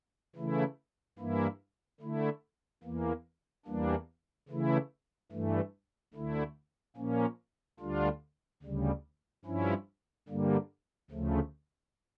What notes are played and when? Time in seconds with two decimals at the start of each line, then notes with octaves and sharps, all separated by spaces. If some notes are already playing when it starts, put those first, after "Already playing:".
0.35 C#3 E3 A3 E4
1.18 G2 E3 A#3 E4
2.00 D3 A3 E4
2.83 E2 E3 A#3
3.66 E2 E3 G3 A#3 D4
4.48 C#3 E3 A3 E4
5.32 G2 E3 A3
6.14 D2 D3 A3 E4
6.97 A#2 F3 A#3 C#4
7.80 D2 D3 G3 D4 F4
8.63 D2 C#3 G3
9.45 G2 F3 C#4 E4
10.28 G2 D3 G3 A#3
11.11 D2 C#3 F3 A3